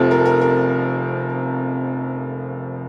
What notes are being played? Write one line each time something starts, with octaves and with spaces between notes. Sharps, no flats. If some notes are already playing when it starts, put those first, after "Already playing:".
Already playing: F1 F2 C3 F3 A4
A#4
A4
A#4
A#4